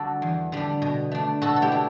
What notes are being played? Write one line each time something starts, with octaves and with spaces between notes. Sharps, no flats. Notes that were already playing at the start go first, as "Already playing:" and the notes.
Already playing: D3 G3 D4 F#4 A4 D5
E2
D3 G3 D4
B2
A3 D4
B2 F#4 A4
A4
E4 G4
A3 D4